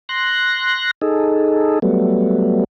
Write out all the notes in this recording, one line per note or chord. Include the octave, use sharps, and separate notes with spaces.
C6 F#6 A#6
D#4 G#4 A4
F#3 G3 A3 B3